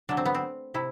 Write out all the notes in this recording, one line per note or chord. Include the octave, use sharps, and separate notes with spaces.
D3 F#3 A3 D4
C4
B3
C4
C3 E4